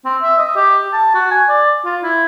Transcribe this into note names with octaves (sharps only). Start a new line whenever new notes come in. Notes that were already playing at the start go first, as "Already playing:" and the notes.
C4
E5
D#5
G4
A5
F#4
G#5
D5
F4
E4